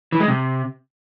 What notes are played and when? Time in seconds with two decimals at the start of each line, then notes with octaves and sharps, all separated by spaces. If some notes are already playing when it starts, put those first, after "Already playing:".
0.12 E3
0.20 G#3
0.28 C3